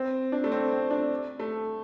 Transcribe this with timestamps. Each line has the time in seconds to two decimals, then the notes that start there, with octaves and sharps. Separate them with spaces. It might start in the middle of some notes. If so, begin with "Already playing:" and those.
Already playing: C4
0.32 D4
0.44 A3
0.52 C4
0.71 C4
0.91 D4
1.40 A3